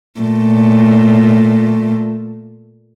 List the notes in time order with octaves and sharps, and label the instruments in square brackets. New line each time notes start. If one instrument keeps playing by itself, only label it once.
[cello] A#2 A3